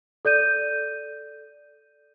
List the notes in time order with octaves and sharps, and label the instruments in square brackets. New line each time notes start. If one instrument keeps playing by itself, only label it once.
[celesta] A4 D5 G6 D#7